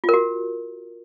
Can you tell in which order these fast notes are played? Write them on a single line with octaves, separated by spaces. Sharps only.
F4 A#4 F#4